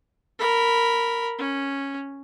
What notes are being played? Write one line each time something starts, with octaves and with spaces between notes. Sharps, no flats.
A#4 B5
C#4